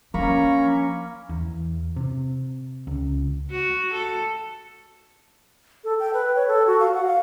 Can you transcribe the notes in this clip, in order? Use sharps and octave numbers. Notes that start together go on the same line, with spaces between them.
F3 A#3 C#4 D4 A#5 B5 C#6
E2
C3
C#2
F#4
A4
A4
G5
B4
C#5
A4
F#4
F5
F#5
F5